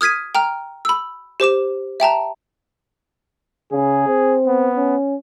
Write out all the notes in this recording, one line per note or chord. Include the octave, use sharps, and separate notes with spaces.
D#6 F6 G#6 B6 D#7
G5 A#5 F6
B5 E6
G4 C5 D6 E7
E5 G5 A5 A#5
C#3 G#4
C4
B3
C#4